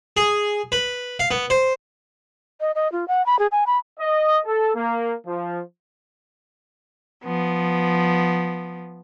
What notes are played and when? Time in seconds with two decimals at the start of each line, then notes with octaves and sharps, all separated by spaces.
0.17 G#4
0.72 B4
1.19 F5
1.31 B3
1.50 C5
2.61 D#5
2.75 D#5
2.92 F4
3.08 F#5
3.26 B5
3.39 G#4
3.52 G#5
3.67 B5
3.99 D#5
4.45 A4
4.75 A#3
5.26 F3
7.25 F3 B3